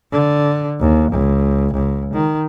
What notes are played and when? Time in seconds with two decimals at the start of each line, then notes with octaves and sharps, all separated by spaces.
0.12 D3
0.80 D#2
1.11 C#2
1.74 C#2
2.13 D#3